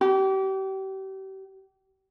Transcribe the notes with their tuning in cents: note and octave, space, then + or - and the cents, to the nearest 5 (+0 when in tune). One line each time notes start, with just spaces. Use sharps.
G4 -35